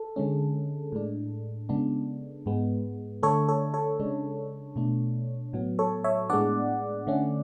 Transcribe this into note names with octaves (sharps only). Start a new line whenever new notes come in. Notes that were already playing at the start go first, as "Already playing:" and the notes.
Already playing: A4
D3 G#3 C#4
A2 G#3 D4
C#3 G#3 B3 D4
G#2 G#3 B3
D3 A3 D4 A4 C#5
A4 C#5
A4 C#5
C#3 G#3 D4
B2 A3 D4
A2 F#3 B3
A4 C#5
C#5 E5
A2 G#3 B3 D4 D5 F#5
D3 A3 C#4